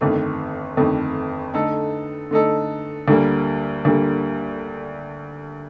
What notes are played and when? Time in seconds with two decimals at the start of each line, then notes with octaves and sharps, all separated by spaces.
0.01 G1 F2 D#3 A3
0.77 G1 F2 D#3 A3
1.54 D3 A3 D#4 A4
2.31 D3 A3 D#4 A4
3.08 D2 D3 G3 A#3
3.85 D2 D3 G3 A#3